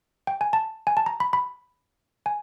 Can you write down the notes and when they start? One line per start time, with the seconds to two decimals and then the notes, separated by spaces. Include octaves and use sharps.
0.27 G5
0.41 G#5
0.53 A5
0.87 G#5
0.97 A5
1.06 A#5
1.20 B5
1.33 B5
2.26 G#5